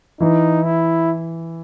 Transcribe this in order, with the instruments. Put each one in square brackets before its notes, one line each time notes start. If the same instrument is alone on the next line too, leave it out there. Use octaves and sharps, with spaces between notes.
[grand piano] E3 [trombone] D#4
[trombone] E4